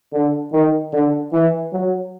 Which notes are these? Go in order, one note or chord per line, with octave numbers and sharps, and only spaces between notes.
D3
D#3
D3
E3
F#3